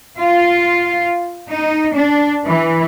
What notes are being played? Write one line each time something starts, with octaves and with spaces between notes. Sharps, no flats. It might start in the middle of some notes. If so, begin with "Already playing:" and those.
F4
D#4
D4
E3